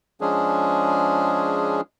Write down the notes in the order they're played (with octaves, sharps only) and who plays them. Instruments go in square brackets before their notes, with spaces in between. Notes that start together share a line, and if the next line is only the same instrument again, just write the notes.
[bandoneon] F3 G#3 C#4 D4 G#4